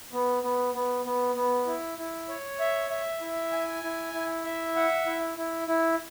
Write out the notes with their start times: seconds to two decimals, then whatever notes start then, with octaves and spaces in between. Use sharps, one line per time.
0.12 B3
0.43 B3
0.74 B3
1.05 B3
1.35 B3
1.66 E4
1.98 E4
2.28 C#5
2.59 E5
2.90 E5
3.21 E4
3.52 G#5
3.83 E4
4.14 E4
4.45 E5
4.76 F#5
5.06 E4
5.37 E4
5.68 E4